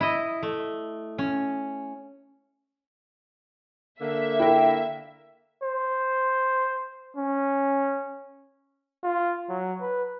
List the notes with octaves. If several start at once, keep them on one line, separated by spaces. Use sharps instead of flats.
E4 D#5
A3
C#4
D3 A#3 E5
E4 A#4 G5
C5
C#4
F4
F#3
B4